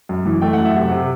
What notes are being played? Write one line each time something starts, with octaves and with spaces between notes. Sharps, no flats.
F#2
E3
A3 G5
F#5
F#2
E5
C3 F#5
C3